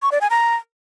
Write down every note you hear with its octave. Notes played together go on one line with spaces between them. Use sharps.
C#6
D5
G#5
A#5